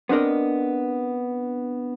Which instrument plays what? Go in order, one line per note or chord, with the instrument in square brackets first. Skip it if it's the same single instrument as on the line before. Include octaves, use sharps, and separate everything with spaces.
[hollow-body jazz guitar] B3 C4 D4 A#4 D#5